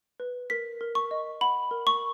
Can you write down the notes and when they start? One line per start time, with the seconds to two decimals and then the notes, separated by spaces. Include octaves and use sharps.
0.20 B4
0.50 A#4 B6
0.81 A#4
0.95 C#6
1.11 D#5
1.41 F#5 B5
1.71 A#4
1.87 C#6